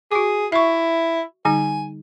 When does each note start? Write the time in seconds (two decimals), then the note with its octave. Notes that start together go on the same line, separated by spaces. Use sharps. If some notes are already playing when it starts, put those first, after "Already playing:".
0.12 F#4 G#4 D6
0.52 E4 E5 C#6
1.45 D3 G3 D#4 G#5